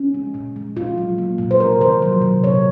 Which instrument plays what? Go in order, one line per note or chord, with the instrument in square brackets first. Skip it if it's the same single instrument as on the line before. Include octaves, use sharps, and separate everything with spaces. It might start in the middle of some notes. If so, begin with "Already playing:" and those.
Already playing: [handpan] C#4
G#3
A#2
G#3
A#2 F4
F#3
A#3
A#2
C5
C3 A#4
D#3 C5
F#3
C3
A#2 C#5